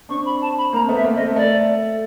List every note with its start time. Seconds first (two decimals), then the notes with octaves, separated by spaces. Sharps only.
0.09 C4 D4 C#6
0.25 B5
0.41 A5
0.57 B5
0.73 A#3 C4 A#5
0.89 A3 B3
0.95 E5
1.04 A#3 C4
1.15 D#5
1.20 A3
1.36 A3 D5